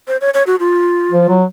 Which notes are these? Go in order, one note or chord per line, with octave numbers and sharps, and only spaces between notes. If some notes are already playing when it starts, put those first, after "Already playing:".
C5
C#5
C#5
F#4
F4
F3
F#3